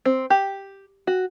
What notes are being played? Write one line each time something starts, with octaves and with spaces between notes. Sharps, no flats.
C4
G4
F#4